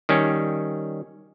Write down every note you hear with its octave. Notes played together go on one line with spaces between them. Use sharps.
D#3 G3 C#4